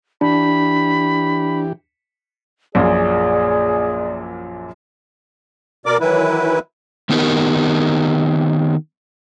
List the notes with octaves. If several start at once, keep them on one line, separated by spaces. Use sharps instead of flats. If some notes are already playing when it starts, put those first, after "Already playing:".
E3 D4 G4 B5
A#1 F#2 A#2 G#4 D5
B2 A#4 D5 D6
D#3 E3 F#3 E4 B4
D#3 B3 C4 D#4 G4 A#4